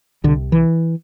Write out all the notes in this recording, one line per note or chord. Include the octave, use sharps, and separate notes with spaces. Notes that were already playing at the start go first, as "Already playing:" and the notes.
C2 C3 D3
E3